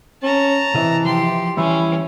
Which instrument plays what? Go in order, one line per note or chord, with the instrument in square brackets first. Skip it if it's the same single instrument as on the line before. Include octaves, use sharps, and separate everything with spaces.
[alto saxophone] C#4 [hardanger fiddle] A5 A#5
[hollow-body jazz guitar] C3 D#5 [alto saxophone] E3
[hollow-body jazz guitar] F3 [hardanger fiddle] G4 C6
[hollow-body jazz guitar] E3 G3 [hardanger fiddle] C#4 [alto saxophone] E4